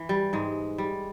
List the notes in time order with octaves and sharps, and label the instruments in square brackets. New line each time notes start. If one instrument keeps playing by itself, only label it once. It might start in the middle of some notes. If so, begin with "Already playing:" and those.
Already playing: [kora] E3
G3
G#2 G#3
G3